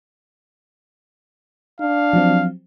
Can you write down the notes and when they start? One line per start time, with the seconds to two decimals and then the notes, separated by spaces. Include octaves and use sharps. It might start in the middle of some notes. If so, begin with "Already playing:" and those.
1.80 D4 F5
2.13 F3 F#3 C4